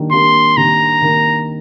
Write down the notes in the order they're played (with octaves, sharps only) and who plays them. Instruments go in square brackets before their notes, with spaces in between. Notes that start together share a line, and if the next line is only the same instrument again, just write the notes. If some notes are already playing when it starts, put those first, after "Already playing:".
Already playing: [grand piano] D#3 G3 A#3 D4
[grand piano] D#3 G3 A#3 D4 [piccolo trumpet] C6
[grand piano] D#3 G3 A#3 D4 [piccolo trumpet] A#5
[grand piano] D#3 G3 A#3 D4